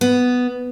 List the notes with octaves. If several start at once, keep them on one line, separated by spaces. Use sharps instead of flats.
B3